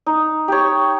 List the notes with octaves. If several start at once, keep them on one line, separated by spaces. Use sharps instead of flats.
D#4
G4 C#5